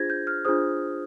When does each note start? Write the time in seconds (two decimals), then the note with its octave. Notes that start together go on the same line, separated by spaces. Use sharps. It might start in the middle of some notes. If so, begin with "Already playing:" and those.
Already playing: D4 F4 G#4 C5 G#6 A#6
0.10 G6
0.27 F6
0.45 D4 F4 G#4 C5 D#6